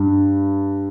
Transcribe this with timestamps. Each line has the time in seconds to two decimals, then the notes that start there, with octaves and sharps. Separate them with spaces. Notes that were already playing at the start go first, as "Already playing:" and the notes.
Already playing: G2